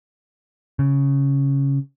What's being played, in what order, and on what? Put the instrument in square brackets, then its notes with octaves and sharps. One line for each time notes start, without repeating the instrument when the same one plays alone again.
[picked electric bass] C#3